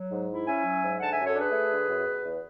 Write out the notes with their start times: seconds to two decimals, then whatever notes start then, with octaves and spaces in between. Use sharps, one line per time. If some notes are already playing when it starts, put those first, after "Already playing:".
Already playing: F#3
0.11 G#2
0.29 E4
0.47 C#4 E5 G#5
0.64 F#3
0.82 G#2
0.99 D3 F#5 A5
1.12 E5 G#5
1.18 F#2
1.26 A4 C#5
1.36 D4 G#4 B4
1.52 A3
1.71 D3
1.88 F#2
2.05 B2
2.24 E2